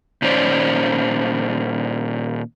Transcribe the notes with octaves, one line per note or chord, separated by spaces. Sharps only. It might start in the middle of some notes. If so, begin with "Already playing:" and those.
A#2 D#3 C#4 C5 D5